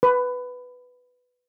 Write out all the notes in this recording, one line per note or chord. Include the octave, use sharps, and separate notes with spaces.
B4